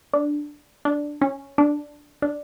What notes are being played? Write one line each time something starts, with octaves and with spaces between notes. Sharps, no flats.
D4
D4
C#4
D4
D4